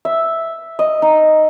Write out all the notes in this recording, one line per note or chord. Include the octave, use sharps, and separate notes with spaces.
E5
D#5
D#4